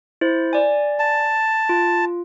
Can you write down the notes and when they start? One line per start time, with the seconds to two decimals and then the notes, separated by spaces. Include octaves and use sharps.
0.21 E4 C5
0.53 D5 G#5
0.99 A5
1.69 F4